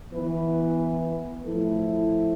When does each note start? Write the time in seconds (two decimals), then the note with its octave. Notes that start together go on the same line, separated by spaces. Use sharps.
0.11 E3 B3 E4 B4
1.44 A2 F3 A3 E4